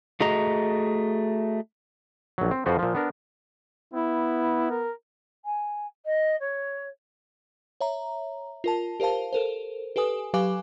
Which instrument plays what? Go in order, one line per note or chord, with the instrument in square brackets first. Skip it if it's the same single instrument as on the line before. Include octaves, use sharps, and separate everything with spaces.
[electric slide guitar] A3 F#4 G#4 D#5 A#5
[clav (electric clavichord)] A#1 F#3
C4
F2 F3 F4 F#4 B4 C5
A#2 F3
B3 D4 A#4
[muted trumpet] B3 [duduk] E4
[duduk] A#4
[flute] G#5
D#5
C#5
[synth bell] C#5 E5 A#5
F4 A#4 A5
G4 A#4 C5 F5 A5
A4 A#4 C5
G4 A4 B4 G#5 D#6
F#3 G4 B4 F5 G#5 D6